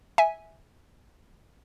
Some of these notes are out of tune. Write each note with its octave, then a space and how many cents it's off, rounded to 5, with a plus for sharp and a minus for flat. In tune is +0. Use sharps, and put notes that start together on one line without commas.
E5 -15 G#5 +0